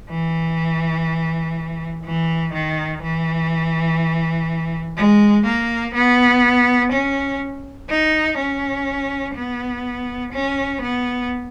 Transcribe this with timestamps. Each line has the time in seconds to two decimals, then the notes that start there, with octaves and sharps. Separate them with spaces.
0.10 E3
2.05 E3
2.53 D#3
3.02 E3
4.97 G#3
5.46 A#3
5.95 B3
6.92 C#4
7.89 D#4
8.38 C#4
9.35 B3
10.33 C#4
10.82 B3